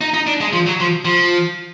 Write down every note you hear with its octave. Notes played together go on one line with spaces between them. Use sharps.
D#4
D#4
D4
G#3
F3
F#3
F3
F3